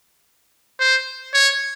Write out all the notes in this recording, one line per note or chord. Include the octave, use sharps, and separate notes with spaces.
C5
C#5